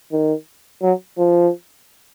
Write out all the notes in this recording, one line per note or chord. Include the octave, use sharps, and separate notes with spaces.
D#3
F#3
F3